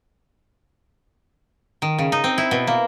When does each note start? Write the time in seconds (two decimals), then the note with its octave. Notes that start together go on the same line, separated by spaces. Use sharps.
1.82 D#3
1.98 C#3
2.12 D#4
2.24 C4
2.38 E4
2.51 B2
2.67 A#3